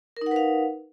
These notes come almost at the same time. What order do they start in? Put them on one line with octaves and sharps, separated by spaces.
A#4 D#4 F#5 B4 F5